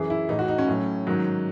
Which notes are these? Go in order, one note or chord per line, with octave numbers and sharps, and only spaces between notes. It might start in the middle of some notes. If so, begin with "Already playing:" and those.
Already playing: F#2 E3 G#4
E4
A2 E3 D#4
F#4
D#4
C#4
A2 F#3
G#2 D#3 F#3